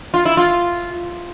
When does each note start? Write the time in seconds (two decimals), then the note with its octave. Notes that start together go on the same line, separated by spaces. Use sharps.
0.14 F4
0.25 E4
0.37 F4